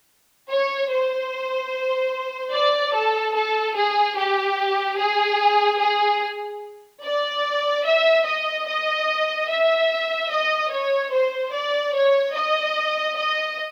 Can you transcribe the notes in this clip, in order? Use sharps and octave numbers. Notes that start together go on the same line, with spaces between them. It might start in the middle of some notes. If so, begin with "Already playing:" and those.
C#5
C5
D5
A4
A4
G#4
G4
G#4
G#4
D5
E5
D#5
D#5
E5
D#5
C#5
C5
D5
C#5
D#5
D#5